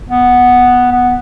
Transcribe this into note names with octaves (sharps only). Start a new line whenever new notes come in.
B3
B3